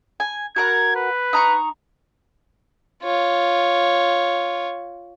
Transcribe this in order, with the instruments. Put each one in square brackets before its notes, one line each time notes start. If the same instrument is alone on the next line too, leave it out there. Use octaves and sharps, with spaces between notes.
[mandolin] G#5
[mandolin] F#4 A#4 F#5 [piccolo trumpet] G#6
[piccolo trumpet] B4
[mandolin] D#4 A#5 C#6
[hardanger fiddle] F4 C#5